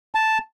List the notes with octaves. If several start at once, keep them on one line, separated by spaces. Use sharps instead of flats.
A5